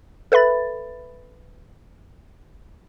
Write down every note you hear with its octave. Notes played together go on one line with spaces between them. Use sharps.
A4 B4 E5 B5 A6